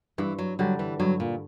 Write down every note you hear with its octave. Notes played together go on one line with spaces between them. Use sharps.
G2 E3
F#3
D3 F#3 G3
E3
G2 F#3
A#2